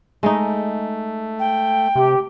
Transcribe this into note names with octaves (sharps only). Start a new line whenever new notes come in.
G#3 A3 D#4
G5
C3 G4